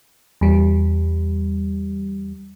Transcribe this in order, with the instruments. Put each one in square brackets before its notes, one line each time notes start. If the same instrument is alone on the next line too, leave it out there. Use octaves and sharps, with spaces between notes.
[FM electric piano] E2 G3